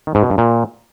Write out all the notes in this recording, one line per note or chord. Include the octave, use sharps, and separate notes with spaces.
D#3
G#2
B2
G2
A#2